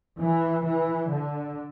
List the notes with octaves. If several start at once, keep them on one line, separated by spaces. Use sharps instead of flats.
E3
E3
D3